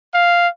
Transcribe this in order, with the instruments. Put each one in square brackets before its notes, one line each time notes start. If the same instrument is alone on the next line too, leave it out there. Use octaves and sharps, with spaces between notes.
[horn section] F5